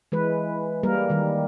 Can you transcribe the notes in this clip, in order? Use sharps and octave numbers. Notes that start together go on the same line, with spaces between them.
E3 G#3 B4
G3 A#3 A#4
D#3 G3